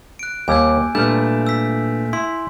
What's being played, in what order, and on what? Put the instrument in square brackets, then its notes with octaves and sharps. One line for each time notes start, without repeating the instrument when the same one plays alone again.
[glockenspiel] F#6 D7
[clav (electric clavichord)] D#2 G3 [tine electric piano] A#3 D6 G#6 [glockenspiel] G#5 E6 G6
[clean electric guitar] A#2 A3 [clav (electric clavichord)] G3 [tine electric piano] D4 B4 F6 [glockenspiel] G6
[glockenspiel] E6 B6
[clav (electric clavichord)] E4 [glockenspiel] C6